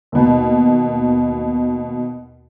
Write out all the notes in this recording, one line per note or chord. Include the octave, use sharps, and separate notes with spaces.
D#2 B2